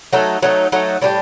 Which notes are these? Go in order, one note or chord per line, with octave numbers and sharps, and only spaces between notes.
F#3 A3 D#4 A4
F#3 A3 D#4 A4
F#3 A3 D#4 A4
A2 G3 D4 G4